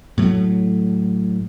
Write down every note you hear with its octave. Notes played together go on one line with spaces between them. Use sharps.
A2 F#3 A3